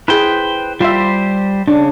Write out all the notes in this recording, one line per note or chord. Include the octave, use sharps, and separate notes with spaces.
E4 G#4 B4 C5 G5
G3 F4 G4 C5 E5
C#3 D4